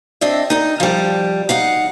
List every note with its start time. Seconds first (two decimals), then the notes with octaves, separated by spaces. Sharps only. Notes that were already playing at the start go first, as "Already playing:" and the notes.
0.21 C4 D4 D#5 E5
0.50 D#4 D#5
0.80 F3 G3
1.49 D#4 F5 F#5